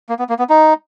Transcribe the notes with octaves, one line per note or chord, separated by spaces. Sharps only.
A#3
B3
A#3
B3
D#4